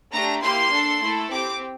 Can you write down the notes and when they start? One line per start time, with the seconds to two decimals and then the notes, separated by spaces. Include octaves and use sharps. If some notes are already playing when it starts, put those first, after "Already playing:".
0.12 A3 D4 G4 A#5
0.42 A#3 E4 G4 C6
0.72 D4 A4
1.01 A3 E4 A4
1.31 C4 G4 D6